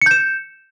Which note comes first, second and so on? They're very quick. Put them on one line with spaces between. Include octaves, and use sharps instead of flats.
C#7 G6 E7